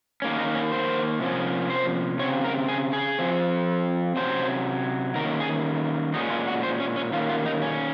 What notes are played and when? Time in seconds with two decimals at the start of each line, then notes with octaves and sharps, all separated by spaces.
0.22 D#3 A#3 C#4
0.38 D#4
0.55 C#4
0.72 C5
1.20 C3 F3 A#3 C#4
1.70 C5
2.19 C#3 F3 C4 C#5
2.44 A#4
2.68 G#4
2.93 G#4
3.19 F3 C4
4.16 C3 F#3 C#4 C5
5.15 D#3 A#3 C#4 A#4
5.40 G#4
6.14 A#2 G#3 C#4 D#4
6.30 F4
6.48 F#4
6.63 C5
6.80 C#4
6.96 C#4
7.13 D#3 A#3 C#4 F4
7.29 F4
7.46 D#4
7.62 C#4